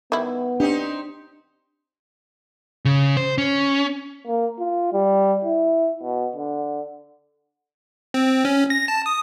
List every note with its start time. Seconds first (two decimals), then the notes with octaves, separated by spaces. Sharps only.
0.12 D#3 G3 B3 E4
0.60 C4 D4 D#4 G4
2.85 C#3
3.17 C5
3.38 C#4
4.27 A#3
4.59 F4
4.93 G3
5.44 E4
6.03 B2
6.36 D3
8.14 C4
8.45 C#4
8.70 A#6
8.88 A5
9.06 D#6